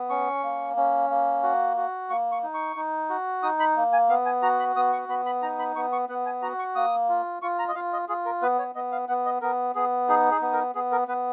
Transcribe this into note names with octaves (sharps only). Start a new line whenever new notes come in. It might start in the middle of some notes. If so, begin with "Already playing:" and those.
Already playing: B3
C#4 C#6
A#3
C#4
A#3
F#4
F#4
A#3 C#6
C#6
D#4
C#6
D#4
F#4
D#4 D#6
B5
A#3
G#5
B3 F5
G#5
F#4 A#5
B5
B3 D#6
C#6
B3 B5
B5
D#4 A#5
B5
B3 C#6
C#6
B3 F#5
G#5
F#4 A#5
C#6
A#3 D#6
F4
F4 C#6
A#5
D#5
F4 F5
D#5
F4 G#4
A#4
B3 B4
C#5
B3 D#5
F5
B3 F#5
D#5
B3 A#4
B3 G#4
D#4 G#4
G#4
B3
A#4
B3 G#4
A#4
B3 B4